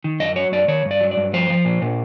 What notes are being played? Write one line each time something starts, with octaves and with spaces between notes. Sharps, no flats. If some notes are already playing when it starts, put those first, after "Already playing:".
D#3
F#2 D#5
F#3 C#5
F#2 D5
D#3 C#5
G2
D5
F#3
D5
G2
F3 C5
F3
A#2
A#2